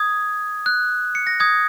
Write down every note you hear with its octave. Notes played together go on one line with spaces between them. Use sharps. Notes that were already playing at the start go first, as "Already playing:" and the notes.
Already playing: D#6 G#6
F#6
C#7
A#6
D#6 G#6